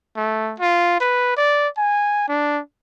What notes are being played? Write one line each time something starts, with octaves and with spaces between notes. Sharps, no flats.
A3
F4
B4
D5
G#5
D4